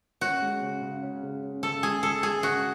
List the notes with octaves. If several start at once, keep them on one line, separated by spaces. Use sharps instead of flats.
C#4 F#4
G#3
C#3
C#3
C#4
C#3
C#4
C#3 A4
G#3 G#4
C#3 A4
C#4 G#4
C#3 F#4